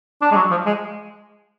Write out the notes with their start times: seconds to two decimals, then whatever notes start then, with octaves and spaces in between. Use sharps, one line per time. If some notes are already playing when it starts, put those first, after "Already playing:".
0.22 D4
0.31 G#3
0.36 F#3
0.51 F3
0.65 G#3